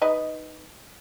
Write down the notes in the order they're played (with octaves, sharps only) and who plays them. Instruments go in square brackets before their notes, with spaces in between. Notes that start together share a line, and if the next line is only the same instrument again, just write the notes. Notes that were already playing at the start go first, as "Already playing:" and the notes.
[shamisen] D#4 B4 D#5